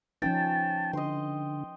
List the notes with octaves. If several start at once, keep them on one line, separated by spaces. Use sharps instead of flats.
F3 C#4 D#4 G5 A5
D3 D#5 C6